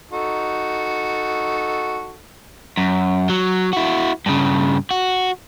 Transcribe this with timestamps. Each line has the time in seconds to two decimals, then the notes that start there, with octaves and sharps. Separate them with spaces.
0.11 D#4 F#4 A4
2.77 F#2
3.29 F#3
3.73 E4 F#4
4.26 G2 C#3
4.91 F#4